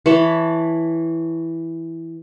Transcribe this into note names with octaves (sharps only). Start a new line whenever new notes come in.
E3 C#5 A5 B5